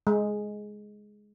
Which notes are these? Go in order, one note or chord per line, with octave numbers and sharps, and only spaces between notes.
G#3